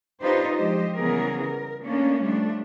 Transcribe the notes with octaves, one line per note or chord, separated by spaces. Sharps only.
D4 D#4 F4 G4 B4 C5
F3 G#3 G4 C5 D#5
C#3 E3 G3 B3 G#4 A#4
A#4
A3 A#3 C#4 D4
F3 G3 A3 D4